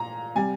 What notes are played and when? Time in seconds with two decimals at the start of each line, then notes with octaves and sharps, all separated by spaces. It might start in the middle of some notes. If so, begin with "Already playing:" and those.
Already playing: A#2 A#5
0.35 C3 G3 G#5